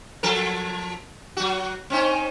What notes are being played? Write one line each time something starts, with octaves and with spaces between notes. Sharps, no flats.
F3 A4 A#4
F#3 F#4
C4 C#4 D#4